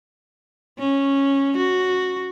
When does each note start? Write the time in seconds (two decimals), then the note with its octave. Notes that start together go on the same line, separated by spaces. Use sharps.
0.79 C#4
1.57 F#4